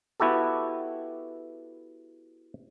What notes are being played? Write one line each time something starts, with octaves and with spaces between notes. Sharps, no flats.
B3 E4 F#4 G4 A4